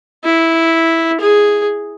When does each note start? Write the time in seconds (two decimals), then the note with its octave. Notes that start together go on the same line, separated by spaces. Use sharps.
0.24 E4
1.21 G#4